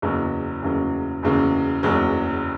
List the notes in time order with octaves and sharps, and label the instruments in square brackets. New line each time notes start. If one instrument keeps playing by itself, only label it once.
[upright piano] F#1 E2 C#3 F#3
F#1 E2 C#3 F#3
F#1 E2 C#3 F#3
F#1 E2 C#3 F#3